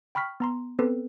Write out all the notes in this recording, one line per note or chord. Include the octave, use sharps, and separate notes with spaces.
G5 B5 C#6 F6 B6
B3 A#5 C6
B3 C4 A4 B4